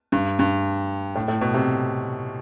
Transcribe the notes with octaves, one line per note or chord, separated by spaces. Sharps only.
G2
G2
A2
A2
B2
C3